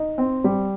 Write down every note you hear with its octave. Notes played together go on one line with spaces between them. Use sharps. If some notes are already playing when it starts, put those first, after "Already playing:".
Already playing: D#4
C4
G3